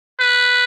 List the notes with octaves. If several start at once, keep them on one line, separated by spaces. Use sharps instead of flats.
B4